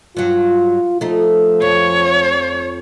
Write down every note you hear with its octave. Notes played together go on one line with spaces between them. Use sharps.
G2 F#3 F4
F3 A3 D#4
F2 C#5